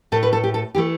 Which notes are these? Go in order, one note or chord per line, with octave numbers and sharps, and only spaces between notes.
A2 A3 A4
B4
A4
G4
A4
E3 A3 G4